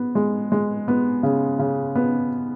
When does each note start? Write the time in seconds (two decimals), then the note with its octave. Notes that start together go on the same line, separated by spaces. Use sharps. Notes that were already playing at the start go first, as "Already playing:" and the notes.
Already playing: B3
0.15 G#3
0.52 G#3
0.88 B3
1.23 C#3
1.59 C#3
1.95 B3